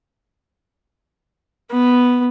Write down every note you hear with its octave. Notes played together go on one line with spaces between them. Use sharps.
B3